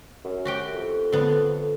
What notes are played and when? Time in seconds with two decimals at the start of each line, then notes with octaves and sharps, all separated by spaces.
0.24 F#2
0.45 F#4 G4 G5
0.74 F2
1.12 D3 B3